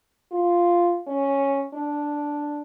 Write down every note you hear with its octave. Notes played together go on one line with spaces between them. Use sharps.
F4
C#4
D4